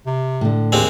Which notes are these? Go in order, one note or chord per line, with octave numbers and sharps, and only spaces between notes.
C3
A2 D3
D#2 G#3 C4 G4